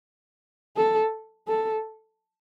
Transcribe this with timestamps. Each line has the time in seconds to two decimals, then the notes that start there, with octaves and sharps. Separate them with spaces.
0.77 A4
1.48 A4